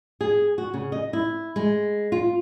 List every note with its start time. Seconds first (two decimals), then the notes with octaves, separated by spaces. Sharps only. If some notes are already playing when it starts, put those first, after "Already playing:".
0.21 G#4
0.58 F#4
0.74 C#3
0.92 D#5
1.13 E4
1.56 G#3
2.12 F4